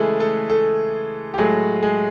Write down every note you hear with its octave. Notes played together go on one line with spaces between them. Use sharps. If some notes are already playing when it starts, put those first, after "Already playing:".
Already playing: C#3 E3 G#3 A3 G#4 A4
A3 A4
A3 A4
G4
A2 F#3 G#3 A3 G#4
G#3 G#4